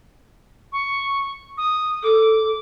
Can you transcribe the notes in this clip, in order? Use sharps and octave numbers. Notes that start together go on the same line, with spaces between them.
C#6
D#6
A4 D6